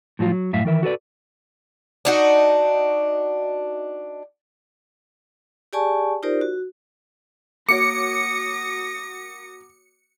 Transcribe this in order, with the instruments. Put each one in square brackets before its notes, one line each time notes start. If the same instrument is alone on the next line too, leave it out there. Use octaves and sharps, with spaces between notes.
[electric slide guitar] A2 F3 F#3 F4
F#3
F#2 A2 E5 F5
D#3 E3 A#4 E5
F#4 A4 B4 D5
[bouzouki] D4 D#4 F#4
[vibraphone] G4 G#4 D5 G#5 A5 C#6
D#4 F4 G4 A#4 C5 D5
F#4
[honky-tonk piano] A#3 F#4 C#5 [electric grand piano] D6 [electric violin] D#6 A#6 [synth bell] C#7